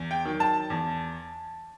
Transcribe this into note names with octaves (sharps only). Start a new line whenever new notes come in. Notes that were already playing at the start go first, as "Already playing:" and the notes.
Already playing: E2
G5
D#3 F#3
A5
E2